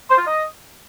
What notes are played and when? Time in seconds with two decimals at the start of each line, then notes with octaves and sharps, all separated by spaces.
0.10 C5
0.18 F4
0.27 D#5